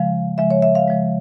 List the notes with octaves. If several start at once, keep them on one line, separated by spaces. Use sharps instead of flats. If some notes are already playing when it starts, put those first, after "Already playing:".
Already playing: C#3 F3 G#3 F5
C#3 F3 G#3 E5
C#5
E5
F5
C#3 F3 G#3